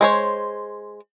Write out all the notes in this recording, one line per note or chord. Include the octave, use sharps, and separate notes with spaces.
G#3 C5 C#5